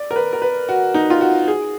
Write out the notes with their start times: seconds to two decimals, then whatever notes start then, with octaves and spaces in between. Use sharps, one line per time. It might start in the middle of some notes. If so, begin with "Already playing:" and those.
Already playing: D5
0.11 A#4
0.16 B4
0.33 A#4
0.42 B4
0.69 F#4
0.94 D#4
1.10 F4
1.21 F#4
1.48 G#4